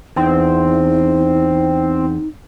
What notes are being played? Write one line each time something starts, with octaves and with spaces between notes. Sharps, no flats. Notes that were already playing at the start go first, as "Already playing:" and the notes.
E2 C4 D#4